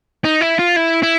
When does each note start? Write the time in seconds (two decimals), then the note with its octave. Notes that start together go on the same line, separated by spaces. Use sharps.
0.24 D#4
0.41 E4
0.59 F4
0.76 E4
1.03 E4